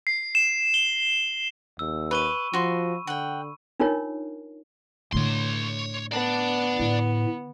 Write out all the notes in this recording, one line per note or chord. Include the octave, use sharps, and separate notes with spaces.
C7
E7
G7
D#2 E6
B4 B5 C#6 D#7
F3 F#4 C6
D3 F#5 G5
D4 D#4 F4 A#4 C#5
A2 D3 C#5 C6
B3 D5 A5
A2 D3